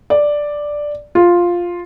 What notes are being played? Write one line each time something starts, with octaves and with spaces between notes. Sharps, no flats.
D5
F4